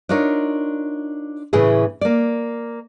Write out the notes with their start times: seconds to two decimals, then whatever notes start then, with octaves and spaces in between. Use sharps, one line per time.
0.09 D4 D#4 F4 A#4 C#5
1.53 A2 C#3 E3 E4 G#4
2.01 A#3 D5